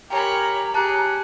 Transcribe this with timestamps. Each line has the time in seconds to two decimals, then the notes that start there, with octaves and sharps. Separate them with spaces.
0.10 G4 A#4 C#5 G5 G#5 A#5 B5
0.74 G4 G#4 A5 F#6 C#7